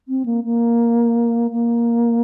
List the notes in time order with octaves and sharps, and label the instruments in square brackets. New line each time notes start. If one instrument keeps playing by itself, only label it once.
[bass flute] C4
A#3
A#3
A#3